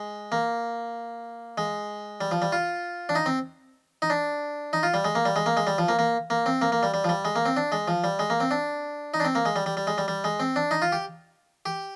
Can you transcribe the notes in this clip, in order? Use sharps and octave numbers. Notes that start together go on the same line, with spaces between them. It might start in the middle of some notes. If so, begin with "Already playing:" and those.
Already playing: G#3
A#3
G#3
G3
F3
G3
F4
D4
D#4
C4
D#4
D4
D#4
F4
G3
G#3
A#3
G3
G#3
A#3
G#3
G3
F3
A#3
A#3
A#3
C4
A#3
A#3
G3
G3
F3
G3
G#3
A#3
C4
D4
G#3
F3
G3
G#3
A#3
C4
D4
D#4
D4
C4
A#3
G#3
G3
G3
G3
G#3
G3
G3
G#3
C4
D4
D#4
F4
G4
G4